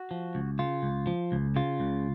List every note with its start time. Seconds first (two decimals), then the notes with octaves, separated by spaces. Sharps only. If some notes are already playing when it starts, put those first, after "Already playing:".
Already playing: F#4
0.11 F3
0.35 C#2
0.59 C#3 F4
0.83 C#2
1.07 F3
1.32 C#2
1.56 C#3 F4
1.80 C#2